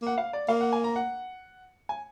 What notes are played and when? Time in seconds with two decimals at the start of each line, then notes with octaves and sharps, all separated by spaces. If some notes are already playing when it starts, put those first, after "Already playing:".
0.02 A#3 F#5
0.18 F5
0.33 D5
0.48 A#3 F5
0.61 F#5
0.73 G#5
0.84 A#5
0.96 F#5
1.89 G#5